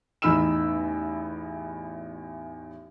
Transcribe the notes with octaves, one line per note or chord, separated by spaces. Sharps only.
A1 E2 D#4 B5 E6 E7